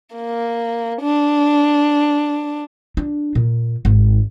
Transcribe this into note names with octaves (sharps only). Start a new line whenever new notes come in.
A#3
D4
D4
A#2
G#1